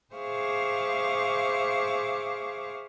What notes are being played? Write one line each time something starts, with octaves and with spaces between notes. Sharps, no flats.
G#4 C5 E5 F5 C#6 D6